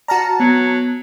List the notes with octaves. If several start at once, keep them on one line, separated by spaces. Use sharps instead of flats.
F#4 D5 A5 A#5 F6 A#6
F#3 B3